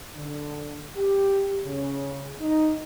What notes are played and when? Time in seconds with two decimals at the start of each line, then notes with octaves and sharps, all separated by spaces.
0.15 D3
0.97 G4
1.63 C#3
2.39 D#4